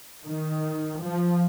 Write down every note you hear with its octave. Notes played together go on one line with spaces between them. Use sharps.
D#3
F3